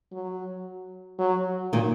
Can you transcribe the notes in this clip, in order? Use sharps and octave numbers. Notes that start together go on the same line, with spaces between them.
F#3
F#3
A#2 D#3